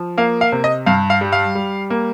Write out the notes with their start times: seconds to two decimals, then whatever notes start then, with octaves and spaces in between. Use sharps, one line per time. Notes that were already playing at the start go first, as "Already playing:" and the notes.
Already playing: F3
0.17 A#3 F5
0.41 F5
0.52 C3
0.64 D#5
0.86 G2 F5
1.10 F5
1.21 G3
1.32 F5
1.55 G3
1.90 A#3